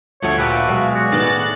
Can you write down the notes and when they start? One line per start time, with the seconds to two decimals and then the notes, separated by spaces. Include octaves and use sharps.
0.22 D2 F3 A3 C#5
0.38 A#2 F#4 G4 B4 E5 A5 D7
0.68 B2 F#3 G#3 F5
0.95 F#4 G#4 D5
1.12 A2 D#3 B3 F#6 A6